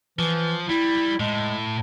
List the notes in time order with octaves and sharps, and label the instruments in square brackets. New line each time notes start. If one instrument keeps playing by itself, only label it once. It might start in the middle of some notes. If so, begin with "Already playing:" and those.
[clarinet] E3 [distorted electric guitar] F3
[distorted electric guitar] G3 [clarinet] E4
[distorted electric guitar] A2 [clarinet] G#3